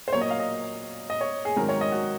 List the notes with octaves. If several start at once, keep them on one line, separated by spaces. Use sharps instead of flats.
C5
A#2 F#3 A#3 C#5
D#5
F5
D#5
D#5
C#5
G#4
G#2 D#3 F#3 C4 A#4
C#5
D#5
F#4